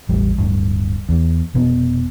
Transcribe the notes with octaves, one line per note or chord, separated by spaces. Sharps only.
E1 A1 G3
D1 G2
E2
F1 B2 B3